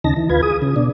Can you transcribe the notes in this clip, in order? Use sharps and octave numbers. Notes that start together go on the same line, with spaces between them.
D#2 C#3 D#4 A5 A#6
E3
D2 F4 B4 G#6
G#4 D#6
C#3
B2 D4